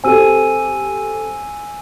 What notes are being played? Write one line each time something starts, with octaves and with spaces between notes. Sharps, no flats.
C4 G4 A4 G#5 E6 D#7